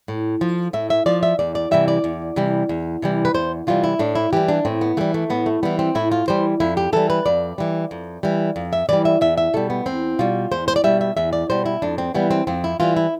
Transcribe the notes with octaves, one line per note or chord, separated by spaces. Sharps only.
A2
F3
A2 E5
E5
F3 D5
E5
E2 D5
D5
C3 E3 G3 E5
D5
E2
C3 E3 G3
E2
C3 E3 G3
B4
E2 C5
C3 E3 G3 F4
E4
A2 D4
E4
E3 G3 G4
D4
A2 C4
B3
E3 G3 A3
A3
A2 B3
A3
E3 G3 B3
C4
A2 E4
F4
E3 G3 C5
F2 E4
G4
E3 G3 A4
B4
F2 D5
E3 G3
F2
E3 G3
F2
E5
E3 G3 D5
E5
E2 E5
E5
B2 G3 A4
B3
E2 C4
B2 G3 F4
E2 C5
C5
D5
B2 G3 E5
E5
E2 E5
D5
B2 G3 C5
E4
F2 D4
C4
E3 G3 B3
C4
F2 C4
E4
E3 G3 F4
E4